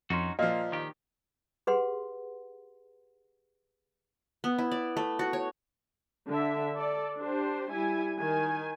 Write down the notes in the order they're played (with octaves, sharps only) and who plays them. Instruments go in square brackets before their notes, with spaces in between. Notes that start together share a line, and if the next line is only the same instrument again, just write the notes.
[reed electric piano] F2 C6 [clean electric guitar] C#4 D#4 F#4
[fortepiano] A#2 F3 [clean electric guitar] A#3 [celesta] D#5 [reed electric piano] F5
[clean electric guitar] D#3 G4
[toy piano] G4 G#4 B4 F#5 C6
[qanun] B3
E4
D5
A3
F#4
C#5
[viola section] D3 E5
A4 D5
D4 G4 C5
G3 E4 G#5
D#3 G#5